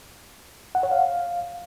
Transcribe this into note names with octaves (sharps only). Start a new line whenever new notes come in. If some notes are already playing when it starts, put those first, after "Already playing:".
F#5
C#5
F5